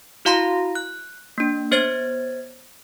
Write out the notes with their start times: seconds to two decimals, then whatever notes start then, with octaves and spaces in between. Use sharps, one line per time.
0.25 E4 F#4 F5 A#5 C6 A#6
0.75 F#6
1.38 A#3 D4
1.71 B3 C5 C#5 G#6 A6